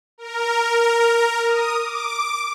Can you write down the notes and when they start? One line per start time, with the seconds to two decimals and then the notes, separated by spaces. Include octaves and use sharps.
0.18 A#4
1.47 D#6
1.81 D6